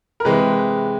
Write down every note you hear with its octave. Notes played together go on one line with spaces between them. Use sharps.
A#4
C3 E3 G#3 B4